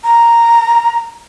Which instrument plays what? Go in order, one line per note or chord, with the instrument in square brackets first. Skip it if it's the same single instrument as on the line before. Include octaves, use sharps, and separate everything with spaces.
[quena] A#5